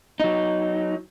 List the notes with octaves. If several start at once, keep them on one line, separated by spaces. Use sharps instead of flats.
F#3 D#4